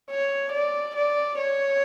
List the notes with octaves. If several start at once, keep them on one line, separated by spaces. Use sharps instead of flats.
C#5
D5
D5
C#5